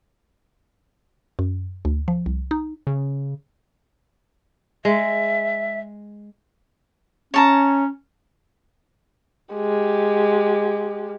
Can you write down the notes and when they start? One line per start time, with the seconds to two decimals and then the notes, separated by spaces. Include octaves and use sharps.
1.39 F#2
1.85 D2
2.08 F3
2.26 C2
2.51 D#4
2.87 C#3
4.85 G#3 E5
7.34 C#4 C#5 A5 A#5
9.55 G#3 G4